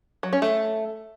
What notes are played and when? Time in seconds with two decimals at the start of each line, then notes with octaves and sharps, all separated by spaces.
0.23 F#3
0.33 C#4
0.42 A3